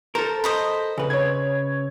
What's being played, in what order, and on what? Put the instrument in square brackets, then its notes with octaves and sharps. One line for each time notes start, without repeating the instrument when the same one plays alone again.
[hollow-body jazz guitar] A4 A#4 [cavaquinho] C5
[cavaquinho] C5 D#5 B5
[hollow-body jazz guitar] C#3 B4
[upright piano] C#5 G#6